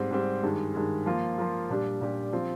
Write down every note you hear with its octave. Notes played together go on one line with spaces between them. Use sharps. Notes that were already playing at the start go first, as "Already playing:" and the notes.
Already playing: G#2 G3 C4
G#2 G3 C4
G2 D#3 G#3
G2 D#3 G#3
F3 A#3 F4
F3 A#3 F4
A#2 G3 D4 G4
A#2 G3 D4 G4
F3 C4 F4